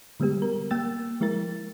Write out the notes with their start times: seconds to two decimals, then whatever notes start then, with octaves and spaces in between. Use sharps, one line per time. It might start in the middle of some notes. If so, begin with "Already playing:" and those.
0.20 D3 G3 G#3 B3 G4
0.42 B3 A#4
0.71 A#3 G5 E6 A6
1.21 F3 G#3 E4 A#4 A6